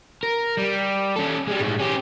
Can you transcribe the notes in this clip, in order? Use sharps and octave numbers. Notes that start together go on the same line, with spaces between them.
A#4
G3
C#4 A4
G3 G#3
A2 G#3
C#4 G4